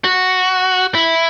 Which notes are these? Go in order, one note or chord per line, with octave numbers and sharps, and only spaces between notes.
F#4
E4